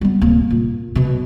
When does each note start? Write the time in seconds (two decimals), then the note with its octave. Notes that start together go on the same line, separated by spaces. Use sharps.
0.01 G3 B3
0.21 D1 A#3
0.51 A#2
0.95 F#2 B2